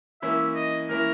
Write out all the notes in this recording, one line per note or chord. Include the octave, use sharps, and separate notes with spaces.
E3 A#3 C#4 E4 E5
D#5
E3 A#3 C#4 E4 A#4